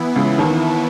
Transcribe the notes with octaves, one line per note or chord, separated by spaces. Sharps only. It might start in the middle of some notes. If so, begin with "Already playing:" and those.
Already playing: E3 B3 E4
C#2 C#3
D#2 D#3